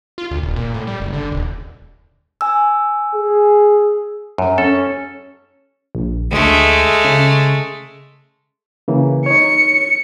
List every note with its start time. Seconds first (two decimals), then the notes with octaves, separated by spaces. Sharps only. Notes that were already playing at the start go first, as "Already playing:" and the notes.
0.18 F4
0.31 D2
0.43 D#1
0.56 A#2
0.74 A2
0.87 G3
1.00 F#1
1.13 D3
1.32 D#1
2.41 G#5 E6
3.15 G#4
4.38 F#2
4.58 C#4 A4
5.95 A#1
6.32 D2 G#3 A3
7.05 C#3
8.88 C#3 E3 A#3
9.26 D#4 C#5 C#7